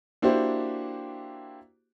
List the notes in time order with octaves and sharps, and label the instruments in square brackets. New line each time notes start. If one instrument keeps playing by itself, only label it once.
[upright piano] A#3 D4 E4 F#4 G4 C5